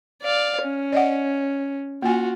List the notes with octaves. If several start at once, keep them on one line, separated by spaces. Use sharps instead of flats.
D5 F5
C#4
D5 D#5 F#5
A#3 F4 F#4 G#5